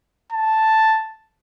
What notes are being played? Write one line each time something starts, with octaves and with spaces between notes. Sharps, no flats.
A5